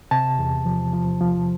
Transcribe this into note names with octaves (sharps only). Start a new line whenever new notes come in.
C3 A5
E2
F3
F3
F3